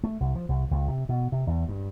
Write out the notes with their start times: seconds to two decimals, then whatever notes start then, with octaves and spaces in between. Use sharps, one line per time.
0.04 A3
0.20 C2
0.36 F3
0.49 C2
0.71 C#2
0.88 C3
1.09 B2
1.32 C3
1.47 E2
1.69 G2